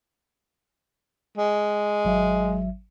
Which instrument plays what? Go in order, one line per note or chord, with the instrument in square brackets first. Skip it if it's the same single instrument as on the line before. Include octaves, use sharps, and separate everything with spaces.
[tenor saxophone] G#3
[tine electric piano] G#1 F#3 E5